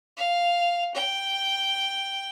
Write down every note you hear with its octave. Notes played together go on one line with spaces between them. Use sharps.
F5
G5